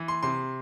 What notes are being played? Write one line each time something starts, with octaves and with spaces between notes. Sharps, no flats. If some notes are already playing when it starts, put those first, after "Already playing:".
Already playing: E3
C6
C3 C6